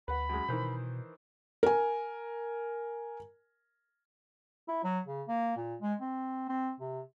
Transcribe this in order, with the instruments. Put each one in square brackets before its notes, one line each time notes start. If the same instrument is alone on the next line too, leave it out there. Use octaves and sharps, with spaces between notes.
[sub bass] D2 [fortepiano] B4 F#5 [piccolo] B5
[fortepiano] F#2 G#3
[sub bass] B2 [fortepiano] D#3 E3 C5
[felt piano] A#4 G#5
[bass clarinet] E4
F#3
C#3
A#3
A#2
G#3
C4
C4
C3